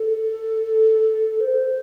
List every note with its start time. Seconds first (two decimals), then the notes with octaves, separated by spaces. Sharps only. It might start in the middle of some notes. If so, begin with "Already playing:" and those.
Already playing: A4
1.40 C5